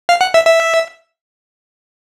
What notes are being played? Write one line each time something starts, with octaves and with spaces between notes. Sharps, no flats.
F5
F#5
E5
E5